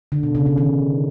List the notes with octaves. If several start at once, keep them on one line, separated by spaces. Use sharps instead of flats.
D3
B2
C#3
C#3
D#3